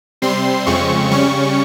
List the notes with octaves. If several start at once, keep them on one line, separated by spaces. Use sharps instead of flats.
C3 G3 C4 C6
F2 C#3 G#3 C4 C#6
C#3 G3 C#4 C#6